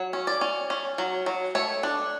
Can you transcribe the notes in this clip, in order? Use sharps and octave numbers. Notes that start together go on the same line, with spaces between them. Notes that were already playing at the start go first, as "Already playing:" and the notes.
Already playing: F#3 C#5
C#4
D5
C#4
C#4
F#3
F#3
A3 C#5
D4